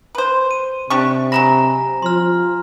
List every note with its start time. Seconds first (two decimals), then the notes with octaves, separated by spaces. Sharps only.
0.15 B4 C5
0.51 D#7
0.90 C3 D4 G4 C#6
1.32 F#3 G#3 G#5 A#5 B5 A#6
2.02 F3 C6 F6